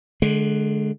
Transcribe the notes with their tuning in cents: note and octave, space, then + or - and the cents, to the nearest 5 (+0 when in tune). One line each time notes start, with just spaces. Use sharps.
D3 +10 G#3 +30